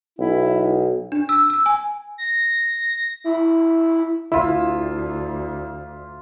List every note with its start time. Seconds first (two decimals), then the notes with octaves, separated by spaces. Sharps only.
0.19 B1 E4
1.12 D4
1.29 E6
1.50 E6
1.66 G#5
2.18 A#6
3.24 E4
4.32 D2 E4 F4 E5